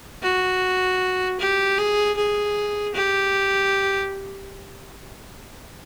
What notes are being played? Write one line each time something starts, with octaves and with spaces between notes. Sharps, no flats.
F#4
G4
G#4
G#4
G4